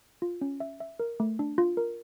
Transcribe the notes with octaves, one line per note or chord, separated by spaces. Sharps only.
F4
C#4
E5
E5
A#4
A3
D4
F4
A#4